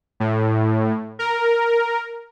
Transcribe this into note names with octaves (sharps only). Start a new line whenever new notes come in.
A2
A#4